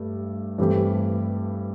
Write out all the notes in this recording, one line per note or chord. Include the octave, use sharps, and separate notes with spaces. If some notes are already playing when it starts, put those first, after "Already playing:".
Already playing: G2 A3
G2 E3 A3 C4 G4